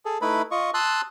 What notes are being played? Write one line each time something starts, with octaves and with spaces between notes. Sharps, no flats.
G#4 A4
A3 D#4 E4 B4 B5
F4 D#5 C#6
A5 C6 D#6 E6 F#6